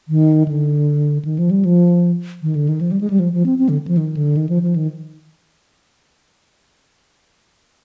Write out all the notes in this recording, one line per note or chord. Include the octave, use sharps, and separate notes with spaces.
D#3
D3
D#3
F3
G3
F3
D#3
D3
D#3
F3
G3
G#3
G3
F3
F3
C4
C4
D3
F3
D#3
D3
D#3
F3
F3
D#3